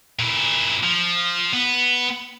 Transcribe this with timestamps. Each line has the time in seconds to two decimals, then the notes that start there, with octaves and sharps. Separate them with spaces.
0.19 A#2 E4
0.83 F3
1.53 B3